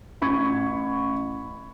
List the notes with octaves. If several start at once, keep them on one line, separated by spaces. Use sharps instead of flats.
A1 B5 C#6 G#6